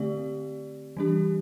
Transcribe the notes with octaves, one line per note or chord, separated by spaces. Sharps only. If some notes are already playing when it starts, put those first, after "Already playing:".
Already playing: D3 A3 C4 G4 D5
E3 G3 D4 G4